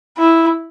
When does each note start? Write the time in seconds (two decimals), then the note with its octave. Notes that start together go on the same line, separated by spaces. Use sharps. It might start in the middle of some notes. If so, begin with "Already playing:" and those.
0.18 E4